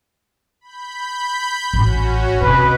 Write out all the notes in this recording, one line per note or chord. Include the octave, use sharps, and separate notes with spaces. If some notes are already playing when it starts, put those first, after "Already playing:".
B5 G6
A1 C#4 F#4
C3 B4 D#5 D6